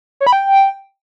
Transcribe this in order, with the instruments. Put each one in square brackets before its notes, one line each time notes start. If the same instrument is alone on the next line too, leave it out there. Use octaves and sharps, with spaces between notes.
[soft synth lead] C#5
B5
G5